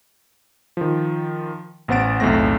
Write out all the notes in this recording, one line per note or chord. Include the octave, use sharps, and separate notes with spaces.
D#3 F3
A1 B3 C5 F#5 A6 D7
B1 E2 A2 A3 C4 A#6